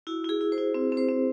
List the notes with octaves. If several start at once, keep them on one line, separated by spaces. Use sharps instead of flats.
E4 F#4
E4 G#4
E4
C5
E4
C4
C4
C5
C4